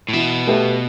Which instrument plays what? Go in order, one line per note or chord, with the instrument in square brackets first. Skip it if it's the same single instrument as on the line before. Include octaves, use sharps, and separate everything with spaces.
[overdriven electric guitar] A2
[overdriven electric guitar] B2 [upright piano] E3
[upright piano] A3 G4 B4 E5